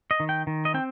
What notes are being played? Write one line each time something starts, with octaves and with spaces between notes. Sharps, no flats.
D#5
D#3
G5
D#3
D#5
C4 G5